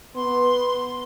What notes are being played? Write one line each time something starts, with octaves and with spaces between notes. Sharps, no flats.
B3 C6